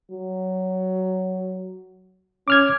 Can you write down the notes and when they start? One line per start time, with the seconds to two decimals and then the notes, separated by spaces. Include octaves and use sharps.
0.11 F#3
2.48 C#4 D6 F6 G#6